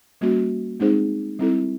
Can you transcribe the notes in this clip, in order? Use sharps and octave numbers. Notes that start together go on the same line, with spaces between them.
G3 A#3 C#4 F#4
G#3 C4 D#4 G#4 C5
G3 C4 E4 A4